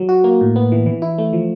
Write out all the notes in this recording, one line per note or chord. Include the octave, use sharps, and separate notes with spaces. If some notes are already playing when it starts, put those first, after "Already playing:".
Already playing: F#3
F#4
A#3
A2
B3
E3
E3
E4
A3
F3